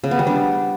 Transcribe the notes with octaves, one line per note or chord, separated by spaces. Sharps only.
C#3
B3
G3
D4